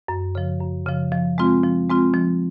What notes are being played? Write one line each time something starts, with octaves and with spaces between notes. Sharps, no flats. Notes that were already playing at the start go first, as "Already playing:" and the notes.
F#2
C#3 F3
F#2
C#3 F3
F3
G#3 C4 F4
F3
G#3 C4 F4
F3